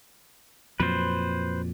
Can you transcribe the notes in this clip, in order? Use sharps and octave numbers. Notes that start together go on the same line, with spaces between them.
F2 A#2 F#3 B4 C5